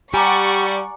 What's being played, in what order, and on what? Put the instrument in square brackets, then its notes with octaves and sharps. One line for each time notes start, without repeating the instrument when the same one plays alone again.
[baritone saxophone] G3 [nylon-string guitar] G4 [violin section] D5 F#5 C#6 [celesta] G#5 A#5 D6